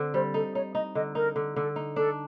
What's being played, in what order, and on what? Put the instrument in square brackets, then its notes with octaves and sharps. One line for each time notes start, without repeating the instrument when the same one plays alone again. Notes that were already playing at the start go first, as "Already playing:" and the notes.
Already playing: [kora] D3 C4
[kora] G3 [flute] C5
[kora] D#4 [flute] A4
[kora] D#4 [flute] C#5
[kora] D#4 [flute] D#5
[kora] D3 [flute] D#5
[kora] D#4 [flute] A#4
[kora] D3
[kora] D3 [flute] A4
[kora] D#4
[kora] D4 [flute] A4